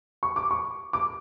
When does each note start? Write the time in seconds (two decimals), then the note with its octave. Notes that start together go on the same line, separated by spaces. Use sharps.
0.23 C#6
0.36 D6
0.51 C#6
0.93 D6